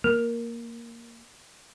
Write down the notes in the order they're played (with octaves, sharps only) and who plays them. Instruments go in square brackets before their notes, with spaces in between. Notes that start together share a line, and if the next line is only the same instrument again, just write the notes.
[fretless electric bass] A#3 [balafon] A#4